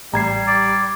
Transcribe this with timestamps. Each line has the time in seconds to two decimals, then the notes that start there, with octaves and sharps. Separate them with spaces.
0.14 A1 G3 A#5 G#6 C7
0.47 D5